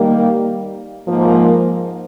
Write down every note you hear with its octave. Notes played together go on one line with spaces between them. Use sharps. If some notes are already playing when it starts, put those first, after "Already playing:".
Already playing: D#3 G3 A#3
G#2 F3 A#3